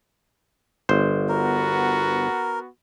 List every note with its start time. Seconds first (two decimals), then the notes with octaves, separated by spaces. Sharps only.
0.89 G1 C5
1.29 B3 F#4 A#4